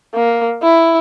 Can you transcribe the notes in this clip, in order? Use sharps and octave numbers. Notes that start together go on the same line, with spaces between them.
A#3
E4